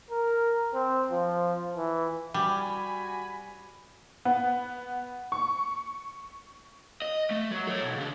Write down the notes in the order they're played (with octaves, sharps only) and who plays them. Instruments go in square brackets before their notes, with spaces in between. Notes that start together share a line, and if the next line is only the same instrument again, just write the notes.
[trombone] A#4
C4
F3
E3
[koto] G3 [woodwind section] F#4 G#5 B5
[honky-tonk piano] B3
C#6
[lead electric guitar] D#5
A3
F#3
A4 C#5
B1
C#3 D4